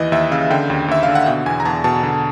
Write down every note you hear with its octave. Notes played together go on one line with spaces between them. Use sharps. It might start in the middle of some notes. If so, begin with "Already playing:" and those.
Already playing: D#2 E3 D#5
D#2 E5
C#3 F5
D3 G5
D#2
D#2 E5
F5
D3
F#5
B2 G5
E2 G#5
A#5
E2 A5
B2 A5
D3